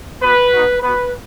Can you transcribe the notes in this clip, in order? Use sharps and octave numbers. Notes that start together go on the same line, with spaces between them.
B3 F#4 B4
B3 D#4 F#4
B3 F#4 B4